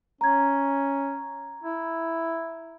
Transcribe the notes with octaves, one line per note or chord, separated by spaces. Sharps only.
C#4 A#5 G#6
E4